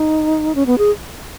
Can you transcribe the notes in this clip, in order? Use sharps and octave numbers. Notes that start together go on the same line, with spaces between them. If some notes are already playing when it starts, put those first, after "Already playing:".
Already playing: D#4
C#4
B3
G#4